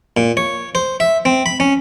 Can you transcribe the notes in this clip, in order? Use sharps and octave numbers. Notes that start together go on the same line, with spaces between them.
A#2
C#5
C5
E5
C4
B5
C#4